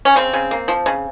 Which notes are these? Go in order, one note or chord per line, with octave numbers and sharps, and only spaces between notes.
C#4
C#3 C4
C#3
A#3
F3
C#3